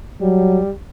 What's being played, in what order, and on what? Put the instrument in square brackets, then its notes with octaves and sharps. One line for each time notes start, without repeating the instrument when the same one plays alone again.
[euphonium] F#3 [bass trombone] G3